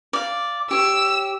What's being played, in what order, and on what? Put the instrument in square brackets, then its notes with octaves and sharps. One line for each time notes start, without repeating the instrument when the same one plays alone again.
[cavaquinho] D5 F5
[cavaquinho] G4 C#5 [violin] E6